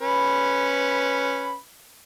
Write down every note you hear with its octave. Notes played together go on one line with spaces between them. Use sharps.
C#4 B4 B5